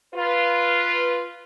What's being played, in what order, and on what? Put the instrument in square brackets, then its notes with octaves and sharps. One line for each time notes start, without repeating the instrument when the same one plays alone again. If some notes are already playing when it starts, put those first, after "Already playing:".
[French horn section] F4 B4